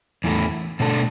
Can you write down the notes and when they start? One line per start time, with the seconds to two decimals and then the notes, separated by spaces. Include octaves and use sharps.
0.24 E2 E3 A3
0.80 B2 A3 D4 A4